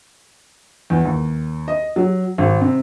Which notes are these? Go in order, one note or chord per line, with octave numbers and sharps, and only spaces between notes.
E2
D#2
D#5
F#3
G#1
C3